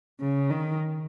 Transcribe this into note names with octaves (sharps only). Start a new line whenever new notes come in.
C#3
D#3